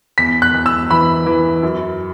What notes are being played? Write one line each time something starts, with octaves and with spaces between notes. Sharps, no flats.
E2 B6
F#6
E2
E6
E3 B5
E3
F#2